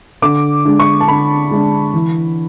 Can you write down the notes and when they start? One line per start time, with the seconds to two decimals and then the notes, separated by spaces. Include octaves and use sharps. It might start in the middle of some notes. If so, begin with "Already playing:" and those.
0.22 D3 D6
0.65 G#3 D4
0.80 C#6
1.00 A5
1.08 D3 B5
1.51 G#3 D4
1.94 E3